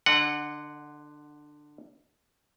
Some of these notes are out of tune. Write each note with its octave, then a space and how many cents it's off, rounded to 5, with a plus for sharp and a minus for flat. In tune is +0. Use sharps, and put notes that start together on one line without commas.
D3 +15 D#5 -35 F#5 +0